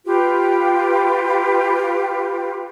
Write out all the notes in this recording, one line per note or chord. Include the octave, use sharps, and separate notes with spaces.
F4 G4 B4